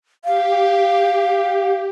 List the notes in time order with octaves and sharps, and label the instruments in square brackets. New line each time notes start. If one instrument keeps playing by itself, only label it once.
[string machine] G4 [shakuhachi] F5